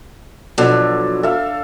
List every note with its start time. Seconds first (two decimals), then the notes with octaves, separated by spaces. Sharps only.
0.58 B2 F3 F#3 D4 A4
1.23 A4 E5 F5